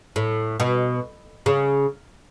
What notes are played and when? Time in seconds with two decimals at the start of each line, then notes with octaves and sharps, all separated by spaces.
0.16 A2
0.60 B2
1.46 C#3